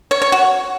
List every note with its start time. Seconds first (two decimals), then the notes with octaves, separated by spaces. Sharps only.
0.11 C#5
0.22 C#5
0.32 F#4